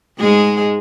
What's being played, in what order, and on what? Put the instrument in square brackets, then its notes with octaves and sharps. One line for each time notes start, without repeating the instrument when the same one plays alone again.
[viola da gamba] G#2 G#3 G#4